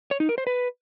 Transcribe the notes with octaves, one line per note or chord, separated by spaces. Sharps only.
C#5
D#4
A#4
C5
B4